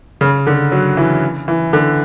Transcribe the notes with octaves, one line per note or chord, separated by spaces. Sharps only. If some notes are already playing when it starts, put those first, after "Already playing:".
C#3
D3
F#3
E3
E3
D3